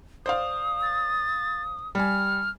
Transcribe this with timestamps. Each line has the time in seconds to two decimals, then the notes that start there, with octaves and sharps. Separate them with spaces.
0.26 C5 D5 F5 D#6
0.82 A6
1.95 G3 G#5 F6